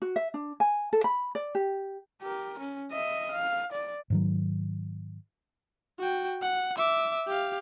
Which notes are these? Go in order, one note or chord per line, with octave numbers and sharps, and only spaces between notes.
F#4
E5
D4
G#5
A4
B5
D5
G4
G4 A#4
C#4
D#5 E5
F5
D5
G#2 D#3 F#3
F#4 G5
F#5
E5 D6
G4 F5